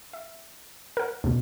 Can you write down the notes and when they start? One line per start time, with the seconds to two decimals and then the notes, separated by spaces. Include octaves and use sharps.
0.13 E5
0.97 A#4 F#5
1.24 D2 B2